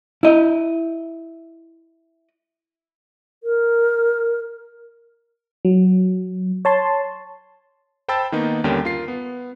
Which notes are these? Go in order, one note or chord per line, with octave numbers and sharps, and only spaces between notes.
E4 D#5
A#4
F#3
C#5 A5 C6
C5 G5 A5 B5 E6 A6
D#3 A#3 B3 D#4
D#2 D3 G3 C#4 A#4 G5
F4 A#4 C7
B3